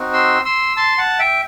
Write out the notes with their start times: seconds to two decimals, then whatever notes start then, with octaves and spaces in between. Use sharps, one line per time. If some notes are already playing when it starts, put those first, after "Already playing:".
Already playing: C4 D#4 F#4
0.13 C6 E6
0.45 C6 E6
0.77 A5 C6
0.98 F#5 A5
1.19 E5 G5